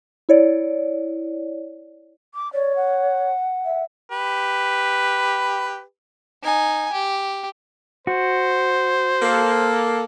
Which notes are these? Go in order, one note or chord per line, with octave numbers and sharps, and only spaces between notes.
E4 C#5 D5
D6
C#5 D5
F#5
E5
G4 B4
D#4 G#5
G4
F#4 C5
A#3 A4